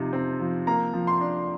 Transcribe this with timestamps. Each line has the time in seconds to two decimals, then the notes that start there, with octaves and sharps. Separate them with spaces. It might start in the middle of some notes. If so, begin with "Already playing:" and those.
Already playing: C3 F3 C4 D#4
0.13 C4
0.40 F3
0.67 A#3 A#5
0.93 F3
1.07 C6
1.21 D4